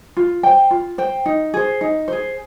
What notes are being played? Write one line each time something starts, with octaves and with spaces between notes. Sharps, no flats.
F4
C5 G5
F4
C5 G5
D#4
G#4 C5
D#4
G#4 C5